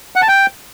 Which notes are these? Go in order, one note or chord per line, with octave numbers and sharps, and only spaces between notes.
F#5
A5
G5